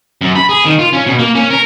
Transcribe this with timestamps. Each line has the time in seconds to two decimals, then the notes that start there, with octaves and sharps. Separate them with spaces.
0.21 F#2
0.36 B5
0.49 G#4
0.65 D#3
0.79 F4
0.93 C#4
1.07 B2
1.19 A#3
1.35 C#4
1.50 A#4